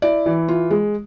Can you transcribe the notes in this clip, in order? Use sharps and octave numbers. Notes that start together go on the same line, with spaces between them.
E4 D5
E3
F4
G#3